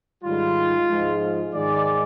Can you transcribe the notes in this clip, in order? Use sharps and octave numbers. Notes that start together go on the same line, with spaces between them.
G#2 D#3 G3 F4
G#2 F3 G#3
G#2 D#3 G#3 D5